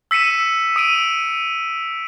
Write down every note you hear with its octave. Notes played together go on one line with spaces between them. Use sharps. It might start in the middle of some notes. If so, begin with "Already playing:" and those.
E6 B6 C#7 D#7 E7
D#6 D7 D#7